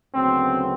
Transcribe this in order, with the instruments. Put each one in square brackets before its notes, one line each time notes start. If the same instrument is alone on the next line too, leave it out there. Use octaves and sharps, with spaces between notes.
[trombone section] D2 C#3 F#3 B3 C4